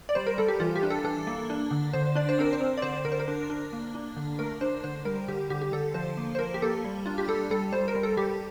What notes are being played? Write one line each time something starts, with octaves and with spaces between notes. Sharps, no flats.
D5
G3 C5
A#4
G3 A4
G4
E3 F4
G4
D4
A4
E3 A4
A#3
D4
D3
D3 C5
D4 D5
C5
C4 A#4
C5
C4
D5
D3 C5
D3 A#4
C5
A#4
D4
D4
A#3
D4
D3
A3 A#4
D4 C5
D3 C5
G3 A#4
D3 G4
D3 G4
G4
D3 A4
F3 C5
A#3
C5
F3 A#4
G4
A#3 A4
G3
D4 F4
G4
G3 A4
G3 A4
G3 C5
A#4
G3
A4
G3 G4